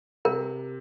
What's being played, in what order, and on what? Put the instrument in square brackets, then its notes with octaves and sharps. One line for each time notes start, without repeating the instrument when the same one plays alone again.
[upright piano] C3 [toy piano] A#4